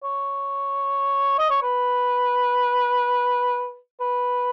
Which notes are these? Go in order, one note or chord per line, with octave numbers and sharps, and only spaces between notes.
C#5
D#5
C#5
B4
B4